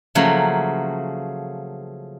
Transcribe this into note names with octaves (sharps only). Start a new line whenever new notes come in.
C#3 F3 F#3 A3 A#3